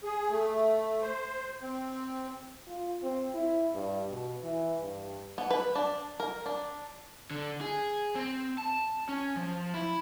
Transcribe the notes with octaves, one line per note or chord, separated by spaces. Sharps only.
G#4
A3
C5
C4
F4
C4
E4
G2
B2
E3
G2
B3
B4
D4
A#4
D4
D3
G#4
C4
A5
C#4
F3
E4